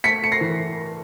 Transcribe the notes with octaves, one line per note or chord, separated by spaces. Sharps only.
A3 B6 C#7
A3 C#7
A#6 C7
E3